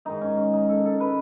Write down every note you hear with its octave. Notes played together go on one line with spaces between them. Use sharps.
G#2 D#3 G#3 D#4
C#4
C#4
D#4
A4
A4
B4